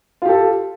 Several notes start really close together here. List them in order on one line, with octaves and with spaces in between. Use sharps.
F4 G4 A4